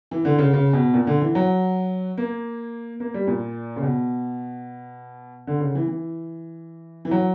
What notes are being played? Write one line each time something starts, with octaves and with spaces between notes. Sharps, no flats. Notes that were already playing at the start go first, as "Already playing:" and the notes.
E3
D3
C#3
C#3
B2
A#2
D3
E3
F#3
A#3
A#3
G3
A#2
C#3
B2
D3
C#3
E3
E3
E3
F#3